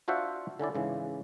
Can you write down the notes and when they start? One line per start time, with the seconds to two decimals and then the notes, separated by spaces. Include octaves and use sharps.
0.08 D4 F4 F#4 C5 E5 F#5
0.59 D3 C#4 E4 D5
0.75 G#2 C#3 E3